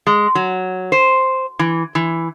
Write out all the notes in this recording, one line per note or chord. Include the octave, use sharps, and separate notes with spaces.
G#3
F#3
C5
E3
E3